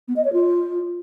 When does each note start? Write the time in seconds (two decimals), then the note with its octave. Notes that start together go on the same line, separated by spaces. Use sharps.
0.08 B3
0.16 D#5
0.25 C#5
0.33 F4